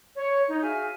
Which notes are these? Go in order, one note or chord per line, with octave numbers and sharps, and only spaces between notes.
C#5
D#4
F#4 G#4 E5 F5 G#5